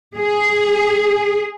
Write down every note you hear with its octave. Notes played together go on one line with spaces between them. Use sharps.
G#4